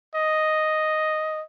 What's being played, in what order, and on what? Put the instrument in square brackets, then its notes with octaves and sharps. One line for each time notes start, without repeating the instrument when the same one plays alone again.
[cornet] D#5